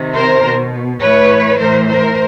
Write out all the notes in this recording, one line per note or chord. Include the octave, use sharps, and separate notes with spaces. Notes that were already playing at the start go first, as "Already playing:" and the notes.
Already playing: C3 D#3
A#4 C5
B2
A2 E3 B4 C#5
A2 E3 A#4 C5
A#4 C5